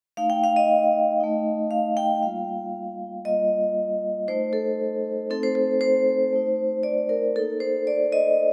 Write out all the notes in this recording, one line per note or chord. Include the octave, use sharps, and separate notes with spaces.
A3 D#4 F5
G5
F5
D#5
A3 D#4
F5
G5
G3 A#3 F4 F5
G3 A#3 F4 D#5
A3 D#4 C5
A4
A3 C4 D#4 A4
C5
C5
C5
A3 D#4
D5
A#4
A#3 D#4 A4
C5
D5
D#5